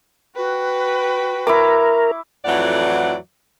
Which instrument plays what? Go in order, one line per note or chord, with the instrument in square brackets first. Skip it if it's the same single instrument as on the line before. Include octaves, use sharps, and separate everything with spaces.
[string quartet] F#4 B4 G5
[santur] E4 C#6 D6 [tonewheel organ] A#4
[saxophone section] F2 A2 E3 F#3 D5 F#5